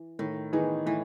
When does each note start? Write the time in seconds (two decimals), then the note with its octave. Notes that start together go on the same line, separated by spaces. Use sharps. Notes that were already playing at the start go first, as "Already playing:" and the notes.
Already playing: E3
0.19 A2 D#3
0.53 D#3 E3 B3 D#4 G#4
0.86 A2 E3